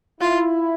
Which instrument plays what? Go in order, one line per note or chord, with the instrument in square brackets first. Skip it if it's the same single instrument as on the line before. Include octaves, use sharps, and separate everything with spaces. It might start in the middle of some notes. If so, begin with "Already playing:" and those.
[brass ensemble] E4 [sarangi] F4